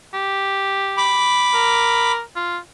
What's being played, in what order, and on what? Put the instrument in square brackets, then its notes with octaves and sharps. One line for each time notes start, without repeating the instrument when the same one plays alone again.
[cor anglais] G4
[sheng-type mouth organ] B5 D6
[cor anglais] A#4
F4